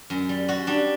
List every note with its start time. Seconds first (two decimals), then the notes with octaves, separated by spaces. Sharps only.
0.10 F#2
0.29 G3
0.48 G3 F#4
0.67 G3 D4